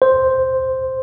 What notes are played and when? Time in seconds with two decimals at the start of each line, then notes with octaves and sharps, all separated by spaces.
0.02 C5